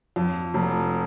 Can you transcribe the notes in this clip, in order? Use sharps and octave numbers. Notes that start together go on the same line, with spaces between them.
F2
F1